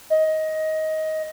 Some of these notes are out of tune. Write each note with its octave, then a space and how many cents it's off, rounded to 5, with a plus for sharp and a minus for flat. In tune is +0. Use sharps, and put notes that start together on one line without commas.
D#5 +15